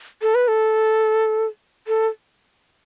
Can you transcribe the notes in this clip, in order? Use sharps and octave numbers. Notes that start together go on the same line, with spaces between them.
A4
B4
A4
A4